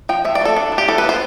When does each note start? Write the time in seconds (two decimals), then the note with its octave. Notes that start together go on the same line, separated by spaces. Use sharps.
0.09 F3 G5
0.25 F3 E5
0.35 D5
0.41 A3 A4
0.57 D4
0.72 E3
0.78 G4
0.88 E3 A4
0.98 B4
1.04 B3
1.09 C5